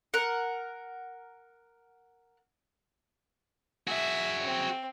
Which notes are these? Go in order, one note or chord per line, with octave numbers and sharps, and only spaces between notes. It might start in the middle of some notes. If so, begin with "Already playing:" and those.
A#4 F#5
F#4 G#4 E5
C4